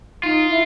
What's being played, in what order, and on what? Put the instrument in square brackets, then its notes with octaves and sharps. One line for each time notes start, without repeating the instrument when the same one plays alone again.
[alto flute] D#4 [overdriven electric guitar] F4
[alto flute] E4